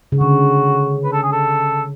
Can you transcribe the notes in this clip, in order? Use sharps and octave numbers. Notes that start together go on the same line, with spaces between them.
C#3
D3 F#4
B4
A4
G#4
A4